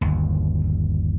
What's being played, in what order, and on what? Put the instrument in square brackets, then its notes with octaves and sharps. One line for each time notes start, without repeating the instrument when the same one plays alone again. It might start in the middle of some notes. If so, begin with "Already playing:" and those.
[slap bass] G1 D#2